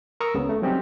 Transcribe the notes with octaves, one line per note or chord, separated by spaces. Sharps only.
A#4 A#5 C#6 D#6 E6
C#2 C#3 B3
A3
F#3 G3 C4 C#4 D#4 G4